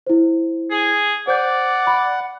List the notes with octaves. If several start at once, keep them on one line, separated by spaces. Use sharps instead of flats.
E4 C5
G#4
C5 D5 F#5 G6
B5